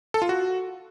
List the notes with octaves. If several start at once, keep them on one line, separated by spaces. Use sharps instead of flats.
A4
F4
F#4